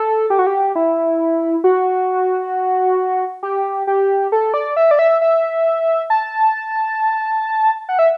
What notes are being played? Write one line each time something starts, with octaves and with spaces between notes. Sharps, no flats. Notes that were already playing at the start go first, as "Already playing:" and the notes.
Already playing: A4
G4
F#4
G4
E4
F#4
G4
G4
A4
D5
E5
D5
E5
E5
A5
F#5
E5